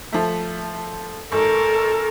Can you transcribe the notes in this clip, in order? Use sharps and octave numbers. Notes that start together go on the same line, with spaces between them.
F3 A3
G#1 A4 A#4